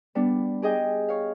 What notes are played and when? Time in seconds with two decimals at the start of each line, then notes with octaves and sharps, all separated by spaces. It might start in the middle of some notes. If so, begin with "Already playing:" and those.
0.15 G3 B3 D4
0.62 G4 G#4 D#5 G5
1.09 C#5 F5